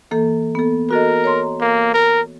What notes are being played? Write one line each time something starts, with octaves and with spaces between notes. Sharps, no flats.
E3 A#3 A4
B3 A4
F#4 A4 A#4 D#5
C#5 A#5 C6
A#3
A#4